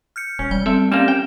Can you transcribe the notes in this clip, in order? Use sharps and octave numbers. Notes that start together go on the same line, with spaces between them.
F6 G6 C#7
E1 C#4
G3 G5
C4 A4 E5
G3 A#3 C4 C#4 E7
G5